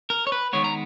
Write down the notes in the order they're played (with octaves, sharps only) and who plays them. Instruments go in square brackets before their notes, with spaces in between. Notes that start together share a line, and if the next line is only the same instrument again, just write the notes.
[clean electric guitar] A#4
C#5
B4
D#3 G#3 B3 C#5
A#5